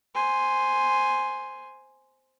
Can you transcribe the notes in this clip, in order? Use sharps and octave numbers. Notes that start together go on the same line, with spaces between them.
C5 G#5